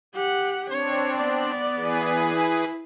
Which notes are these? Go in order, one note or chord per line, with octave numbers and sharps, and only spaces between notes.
G4 F#5
C4 D4 C#5
B3 D5
E3 G#4 B4
E4